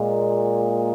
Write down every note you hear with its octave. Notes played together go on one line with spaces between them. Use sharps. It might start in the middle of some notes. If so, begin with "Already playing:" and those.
Already playing: A#2 G#3